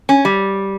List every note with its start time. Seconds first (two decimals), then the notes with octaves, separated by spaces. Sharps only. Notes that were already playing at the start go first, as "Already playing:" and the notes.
0.09 C#4
0.25 G3